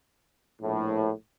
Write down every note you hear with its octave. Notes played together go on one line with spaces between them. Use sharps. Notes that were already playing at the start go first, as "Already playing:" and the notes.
A#1 A2